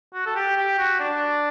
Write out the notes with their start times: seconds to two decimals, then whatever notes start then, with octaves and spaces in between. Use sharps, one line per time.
0.14 F#4
0.26 A4
0.36 G4
0.57 G4
0.79 F#4
1.00 D4